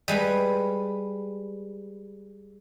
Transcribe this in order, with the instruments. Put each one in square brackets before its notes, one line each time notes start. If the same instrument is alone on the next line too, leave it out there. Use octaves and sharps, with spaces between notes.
[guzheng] G3 G#3 B4